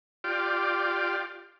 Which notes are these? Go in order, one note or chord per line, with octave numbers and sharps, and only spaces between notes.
F4 G4 D5